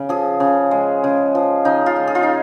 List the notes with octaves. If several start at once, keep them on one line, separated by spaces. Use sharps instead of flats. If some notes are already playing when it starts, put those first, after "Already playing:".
Already playing: C#3
F3 G#4
C#3
G#3
C#3
F3
C#3 D#4
F4
G#3
G#4
F4
D#4